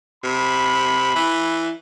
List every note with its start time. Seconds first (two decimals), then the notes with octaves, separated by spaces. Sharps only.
0.24 C3 B5
1.16 E3